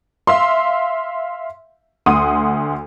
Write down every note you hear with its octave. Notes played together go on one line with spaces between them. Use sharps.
E5 F5 C6
D2 F#5 C6 D#6 D#7